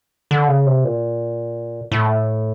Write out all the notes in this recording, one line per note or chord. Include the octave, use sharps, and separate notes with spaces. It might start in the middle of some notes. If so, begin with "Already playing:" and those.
D3
C#3
C3
A#2
A2